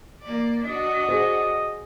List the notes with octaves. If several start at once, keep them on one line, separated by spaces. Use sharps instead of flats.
A#3 D5
D4 F#4 D#5
G#4 C5